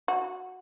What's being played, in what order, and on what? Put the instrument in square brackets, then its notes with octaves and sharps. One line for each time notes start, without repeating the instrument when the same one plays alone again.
[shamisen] F#4